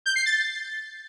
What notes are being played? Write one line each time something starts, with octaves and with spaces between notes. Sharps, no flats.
G6
C7
A6